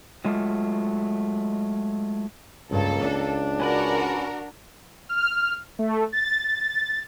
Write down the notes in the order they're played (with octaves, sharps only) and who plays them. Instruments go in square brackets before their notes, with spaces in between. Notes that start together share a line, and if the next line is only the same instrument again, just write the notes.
[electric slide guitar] F#3 G#3 A3 F4
[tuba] C#2 [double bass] G2 [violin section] A#3 A4
[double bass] D4
[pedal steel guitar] C#4 B4 D5 [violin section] F#4 A#4
[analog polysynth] F6
A3
A6